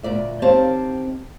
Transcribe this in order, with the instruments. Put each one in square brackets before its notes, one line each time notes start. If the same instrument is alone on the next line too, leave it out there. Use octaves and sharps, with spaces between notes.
[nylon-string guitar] D2 A#2 D5 E5
D#3 C4 G4 C#5 F5 A5